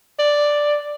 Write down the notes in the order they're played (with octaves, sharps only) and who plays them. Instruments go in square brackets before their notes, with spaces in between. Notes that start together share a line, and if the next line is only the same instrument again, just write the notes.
[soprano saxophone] D5